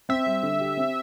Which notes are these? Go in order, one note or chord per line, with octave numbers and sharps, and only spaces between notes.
C4 E5
G3
D3
G4
C4